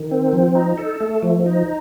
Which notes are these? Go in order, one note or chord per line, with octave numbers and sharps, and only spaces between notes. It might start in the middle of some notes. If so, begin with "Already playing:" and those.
Already playing: D#3
C4
F3
D#4
A4
A3
F3
D#4